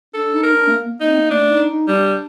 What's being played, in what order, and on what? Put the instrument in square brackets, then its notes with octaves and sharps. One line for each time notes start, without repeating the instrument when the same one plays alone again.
[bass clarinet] D4 [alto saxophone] A4
[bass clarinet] D#4
[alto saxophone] A#4
[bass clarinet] D4
A3
A#3
A#3
[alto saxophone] D#4
[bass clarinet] C4
A#3
[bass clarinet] A3 [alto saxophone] D4
[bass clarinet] D#4
D#4
[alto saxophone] G3 [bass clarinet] D4